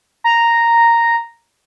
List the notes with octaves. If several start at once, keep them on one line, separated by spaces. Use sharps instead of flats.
A#5